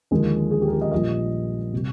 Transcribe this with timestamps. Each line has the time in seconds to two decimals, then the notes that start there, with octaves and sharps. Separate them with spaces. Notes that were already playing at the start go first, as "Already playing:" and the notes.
0.11 D#2 D3 F3 G#3
0.51 G#4
0.62 G4
0.68 A#4
0.72 G#4
0.81 D#5
0.92 A#1 A#2 G3 D#5
1.73 C3 G3